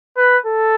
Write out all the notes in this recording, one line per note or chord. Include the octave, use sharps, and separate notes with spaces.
B4
A4